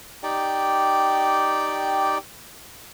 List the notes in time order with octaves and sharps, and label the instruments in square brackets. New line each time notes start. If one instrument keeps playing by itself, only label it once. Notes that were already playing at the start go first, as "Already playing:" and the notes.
[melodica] D#4 G4 D5 G5